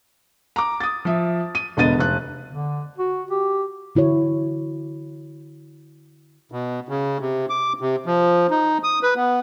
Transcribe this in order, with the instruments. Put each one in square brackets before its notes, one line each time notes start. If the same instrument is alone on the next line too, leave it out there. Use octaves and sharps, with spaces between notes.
[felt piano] A#5 D6
D#6 A6
F3 E5
D#7
E1 D3 B3 D#5 A6 D#7
F1 F#6
[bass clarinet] D3
F#4
G4
[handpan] D3 E4 F#4 C#5
[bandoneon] B2
C#3
C3
D6
C3
F3
D#4
D#6
B4
B3